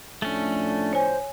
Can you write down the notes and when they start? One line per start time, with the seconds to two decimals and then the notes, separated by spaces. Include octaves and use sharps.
0.22 A2 F3 A3 C#4 D4
0.93 C5 C#5 G#5